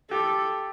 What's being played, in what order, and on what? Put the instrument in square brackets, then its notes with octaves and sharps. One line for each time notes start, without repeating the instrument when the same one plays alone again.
[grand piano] G4 [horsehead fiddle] A4